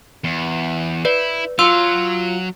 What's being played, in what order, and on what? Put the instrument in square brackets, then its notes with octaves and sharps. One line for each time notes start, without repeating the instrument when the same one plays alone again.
[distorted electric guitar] E2
[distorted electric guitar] E4 [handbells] B4 D5
[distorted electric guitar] F#3 [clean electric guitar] F4 [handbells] E6